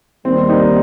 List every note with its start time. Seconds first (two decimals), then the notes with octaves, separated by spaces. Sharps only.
0.24 D#2 D#3 G3 C4
0.49 D#4